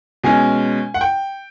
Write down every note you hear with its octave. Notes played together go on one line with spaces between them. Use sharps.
B2 G#3 C#4 G#5
F#5
G5